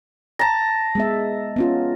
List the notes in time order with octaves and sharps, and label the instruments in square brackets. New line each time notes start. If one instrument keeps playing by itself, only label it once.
[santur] A5 A#5
[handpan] G#3 B3 E5
B3 C#4 F4